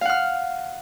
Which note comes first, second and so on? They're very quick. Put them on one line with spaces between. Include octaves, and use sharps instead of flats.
F5 F#5 F6